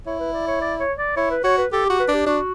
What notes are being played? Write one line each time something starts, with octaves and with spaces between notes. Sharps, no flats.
E4 C#5
B4
D5
C#5
D5
C#5
D5
E4 C#5
B4
F#4 C#5
B4
G4 A4
F#4 G4
B4
D4 G4
D4 F#4